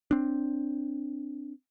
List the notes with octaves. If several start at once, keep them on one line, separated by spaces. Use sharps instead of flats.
C4 D4